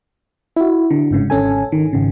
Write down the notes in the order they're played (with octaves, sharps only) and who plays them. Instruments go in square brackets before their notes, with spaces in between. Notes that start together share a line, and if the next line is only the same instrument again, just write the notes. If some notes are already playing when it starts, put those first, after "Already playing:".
[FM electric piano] E4 F#4
D3
G1 G#2 C#3
G#1 C#4 A4 G#5
D#3
G#1 C#3